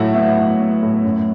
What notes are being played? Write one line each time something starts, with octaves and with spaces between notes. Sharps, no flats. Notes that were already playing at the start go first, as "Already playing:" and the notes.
Already playing: A2 F#3 E4 F#4 E5 F#5
B3 E4 E5
A2
B3
A2
F#2